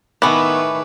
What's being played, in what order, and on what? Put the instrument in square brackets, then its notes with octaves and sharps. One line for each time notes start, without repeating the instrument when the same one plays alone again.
[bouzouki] A2 A3 [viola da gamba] D#3 B4 [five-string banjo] B3 [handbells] G#5 C#6 D6